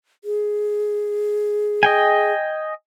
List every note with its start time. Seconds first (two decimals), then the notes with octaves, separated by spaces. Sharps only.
0.24 G#4
1.83 D#5 G5 G#5